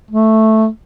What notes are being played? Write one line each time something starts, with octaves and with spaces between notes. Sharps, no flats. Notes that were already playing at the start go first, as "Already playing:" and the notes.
A3